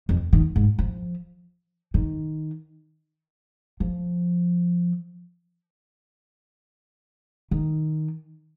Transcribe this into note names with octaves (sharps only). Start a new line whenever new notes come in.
F2
D#3
G#2
F3
D#3
F3
D#3